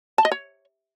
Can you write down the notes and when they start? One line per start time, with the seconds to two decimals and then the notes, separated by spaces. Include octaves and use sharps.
0.18 A5
0.25 D#5
0.32 C#5